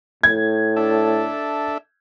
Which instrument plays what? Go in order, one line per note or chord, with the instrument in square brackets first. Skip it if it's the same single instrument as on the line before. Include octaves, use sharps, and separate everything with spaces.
[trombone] A2 [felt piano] G#6
[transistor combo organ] D4 A4 E5